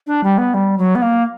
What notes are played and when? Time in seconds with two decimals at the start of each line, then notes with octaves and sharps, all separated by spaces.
0.07 D4
0.24 G3
0.38 B3
0.54 G3
0.78 F#3
0.95 B3
1.02 A#3